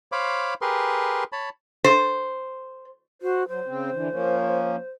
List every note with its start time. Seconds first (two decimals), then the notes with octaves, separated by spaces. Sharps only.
0.12 C5 C#5 F5 B5 D6
0.61 G4 G#4 A#4 B4 C6
1.32 C#5 A5 B5
1.84 C5
3.22 F#4 C5
3.48 F#3 C5
3.66 C#3 C4
3.93 D3 E3
4.11 F3 A#3 C#4